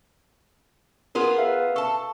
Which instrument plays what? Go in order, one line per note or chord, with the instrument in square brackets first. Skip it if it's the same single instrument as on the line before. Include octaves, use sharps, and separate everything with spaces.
[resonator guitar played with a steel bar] B3 F4 G#4 [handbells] A#4
[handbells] B4 E5 F5
[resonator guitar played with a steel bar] A4 A5 [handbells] C#6